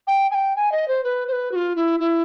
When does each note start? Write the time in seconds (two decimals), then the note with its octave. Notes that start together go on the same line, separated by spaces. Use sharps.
0.07 G5
0.31 G#5
0.35 G5
0.56 G#5
0.72 D#5
0.88 C5
1.04 B4
1.28 C5
1.33 B4
1.52 F#4
1.56 F4
1.76 E4
2.00 E4